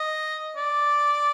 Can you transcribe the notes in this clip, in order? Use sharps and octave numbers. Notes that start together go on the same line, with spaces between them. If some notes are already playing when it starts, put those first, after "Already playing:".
Already playing: D#5
D5